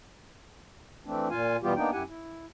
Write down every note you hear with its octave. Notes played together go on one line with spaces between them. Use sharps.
E3 A3 C4 D4
A#2 F4 F5 G#5
B2 E3 G3 B3 F4 G4
A#3 B3 D4 D#4 G5
F#2 E4 G4 F#5 G#5
E4